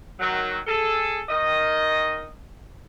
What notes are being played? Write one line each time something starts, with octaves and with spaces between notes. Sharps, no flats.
D#3 F#3
G#4 A4
D#3 D#5